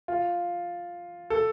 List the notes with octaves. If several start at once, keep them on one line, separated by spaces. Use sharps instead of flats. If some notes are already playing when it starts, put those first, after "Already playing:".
F4
A4